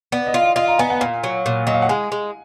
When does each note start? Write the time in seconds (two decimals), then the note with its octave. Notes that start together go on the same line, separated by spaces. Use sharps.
0.12 B3 D5
0.27 D#5
0.34 F4
0.42 F5
0.56 F4 D#5
0.68 A#5
0.78 B3 G#5
0.90 F#5
1.01 A#2 F5
1.24 F#3
1.46 A#2
1.67 F#3 D#5
1.74 F5
1.82 F#5
1.89 G#3 G#5
2.12 G#3